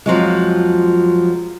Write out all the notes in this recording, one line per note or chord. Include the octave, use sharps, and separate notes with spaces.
F2 F3 F#3 G#3